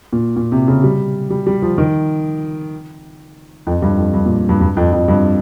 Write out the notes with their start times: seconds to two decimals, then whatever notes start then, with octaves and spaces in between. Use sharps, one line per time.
0.13 A#2
0.36 A#2
0.52 C3
0.68 C#3
0.84 G3
1.30 G3
1.46 G3
1.62 F3
1.78 D#3
3.67 F2
3.82 G2
3.98 F2
4.13 G2
4.26 A#2
4.49 G2
4.61 G2
4.77 F2
4.92 F2
5.08 G2